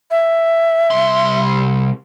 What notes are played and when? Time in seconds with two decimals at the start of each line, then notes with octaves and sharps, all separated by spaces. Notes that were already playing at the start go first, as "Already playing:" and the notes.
0.11 E5
0.91 C2 C6